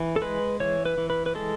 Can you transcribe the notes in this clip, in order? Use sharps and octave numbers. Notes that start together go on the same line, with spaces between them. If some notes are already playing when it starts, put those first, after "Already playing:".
Already playing: E3
A4
G#3 B4
E3 C#5
B4
E3
B4
B4
G#3 A4